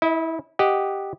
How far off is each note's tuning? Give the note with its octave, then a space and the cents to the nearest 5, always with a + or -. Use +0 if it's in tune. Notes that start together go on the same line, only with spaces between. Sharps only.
E4 -20 D#5 +30
G4 +0 D#5 +0 F#5 +0